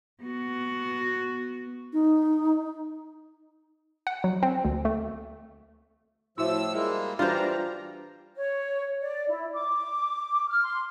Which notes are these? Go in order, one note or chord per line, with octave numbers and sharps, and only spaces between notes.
B3 F#4
D#4
F#5
F#3
C4
D2
A3
A2 F3 E4 F#4 E5 E6
G3 G#3 A#3 G#4 E5
E3 G3 D4 F4 F#4 C5 A#5
C#5
D5
E4
D6
F6
C6